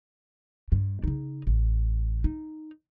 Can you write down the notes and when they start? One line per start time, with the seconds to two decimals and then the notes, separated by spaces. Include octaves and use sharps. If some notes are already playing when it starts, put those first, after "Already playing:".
0.72 G2 D4
1.04 C#3 D#4
1.47 A1
2.24 D#4